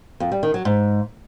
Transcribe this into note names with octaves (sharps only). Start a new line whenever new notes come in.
F2
G3
D#3
F#3
G#2